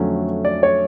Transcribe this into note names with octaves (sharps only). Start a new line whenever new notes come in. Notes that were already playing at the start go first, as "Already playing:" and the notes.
Already playing: F2 D3 F#3 A3 C#4
D5
C#5